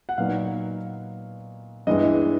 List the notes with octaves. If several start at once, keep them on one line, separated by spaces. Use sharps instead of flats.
F#5
A#2 F#3 B3 D#4 F5
G2 E3 G#3 B3 D#5